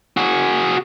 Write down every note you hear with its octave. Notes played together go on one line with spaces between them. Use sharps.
F#4 G#4